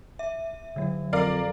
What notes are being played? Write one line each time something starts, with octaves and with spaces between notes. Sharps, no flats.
E5
D3 F#3
F2 A#4 D5 F5